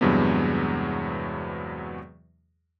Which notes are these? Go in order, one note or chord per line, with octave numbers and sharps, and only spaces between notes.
E2 G2 C3 F#3 G#3 B3